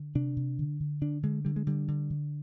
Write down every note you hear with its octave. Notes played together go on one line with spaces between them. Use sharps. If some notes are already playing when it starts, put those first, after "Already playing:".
Already playing: D3
C3 D4
C3
D3
D3
D3 D4
D3 G#3
D3 G3
G#3
D3 G3
D3
D3